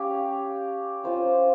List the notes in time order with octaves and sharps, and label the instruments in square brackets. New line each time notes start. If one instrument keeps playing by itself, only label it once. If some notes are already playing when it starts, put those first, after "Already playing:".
Already playing: [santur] C#4 G4 C#5 F5
C#4 F4 C5 F5